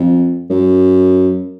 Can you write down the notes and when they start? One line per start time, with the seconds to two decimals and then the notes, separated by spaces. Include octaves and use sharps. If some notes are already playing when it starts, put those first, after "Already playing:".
Already playing: F2
0.50 F#2